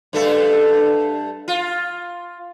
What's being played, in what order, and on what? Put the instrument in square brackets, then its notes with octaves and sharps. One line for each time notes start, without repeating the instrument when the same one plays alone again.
[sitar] G2 A3 A4
F4